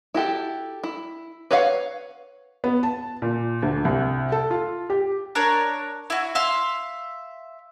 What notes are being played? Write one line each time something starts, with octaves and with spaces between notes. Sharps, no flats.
E4 F#4 G4 A4
E4
B4 C#5 D5 F5 F#5
B3
A5
A#2
D2
C2
A4
F4
G4
D4 A#4 C#5
E4 F#4
E5 F5 C6